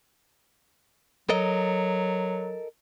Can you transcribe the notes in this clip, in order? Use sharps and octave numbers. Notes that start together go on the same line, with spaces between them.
F#3 A4 A#4 D#5